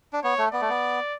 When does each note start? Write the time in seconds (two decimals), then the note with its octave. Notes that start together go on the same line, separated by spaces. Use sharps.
0.13 D4
0.23 B3 C#5
0.38 A3
0.53 B3 D5
0.61 A3
0.69 B3